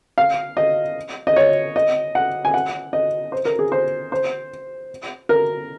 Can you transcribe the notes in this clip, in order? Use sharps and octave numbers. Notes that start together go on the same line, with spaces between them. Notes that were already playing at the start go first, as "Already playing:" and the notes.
F5
D#5
D#5
C#5
D#5
F#5
G#5
F#5
D#5
C5
A#4
G#4
C5
C5
A#4